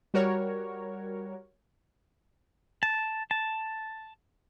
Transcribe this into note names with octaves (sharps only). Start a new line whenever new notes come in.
G3 F#4 A#4 C#5
A5
A5